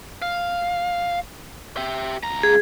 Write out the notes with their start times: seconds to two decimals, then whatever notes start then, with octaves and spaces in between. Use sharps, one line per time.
0.22 F5
1.77 G4 E5
2.23 C#2 A#5
2.43 G#4